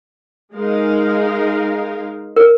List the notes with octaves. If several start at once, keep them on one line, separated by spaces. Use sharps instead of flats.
G#3 D#4 A#4 F5
A#4